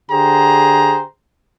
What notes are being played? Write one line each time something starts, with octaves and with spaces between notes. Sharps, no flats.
D3 G4 G#4 C5 A#5